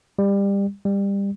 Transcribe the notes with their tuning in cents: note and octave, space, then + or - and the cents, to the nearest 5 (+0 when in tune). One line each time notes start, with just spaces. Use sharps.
G3 +25
G3 +25